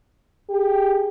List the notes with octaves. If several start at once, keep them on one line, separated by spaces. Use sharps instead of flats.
G4 G#4